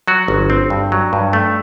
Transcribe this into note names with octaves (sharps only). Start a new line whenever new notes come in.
F#3 F#4
G1
C4
G2
F#3
G2
A3